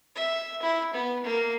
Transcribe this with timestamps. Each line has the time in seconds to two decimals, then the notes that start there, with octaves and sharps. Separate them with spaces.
0.15 E5
0.62 E4
0.93 B3
1.23 A#3